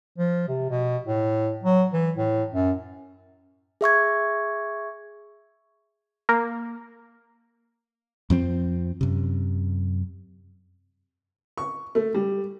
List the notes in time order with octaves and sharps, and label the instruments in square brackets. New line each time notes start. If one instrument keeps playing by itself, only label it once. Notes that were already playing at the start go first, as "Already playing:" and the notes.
[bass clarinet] F3
C3
B2
A2
F#3
E3
A2
F#2
[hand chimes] G#4 E5 C#6 G#6
[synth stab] A#3
[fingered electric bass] F2 F3 C4
F#2 C3
[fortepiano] C#6
A3
G3